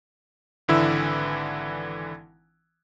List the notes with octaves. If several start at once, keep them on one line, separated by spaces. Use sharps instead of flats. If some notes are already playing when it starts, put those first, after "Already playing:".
G#1 D3 E3 E4 E6